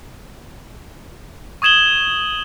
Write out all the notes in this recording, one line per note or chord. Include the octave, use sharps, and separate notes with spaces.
C#6 D#6 G#6 E7 F#7 G7